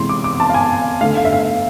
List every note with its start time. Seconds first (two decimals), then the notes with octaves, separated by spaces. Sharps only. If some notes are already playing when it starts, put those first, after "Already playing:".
Already playing: C3 E3 G#3 C6
0.09 D6
0.24 D6
0.40 A5
0.50 F5
0.54 G#5
1.01 D3 A3 F5
1.17 F5
1.25 E5
1.33 F5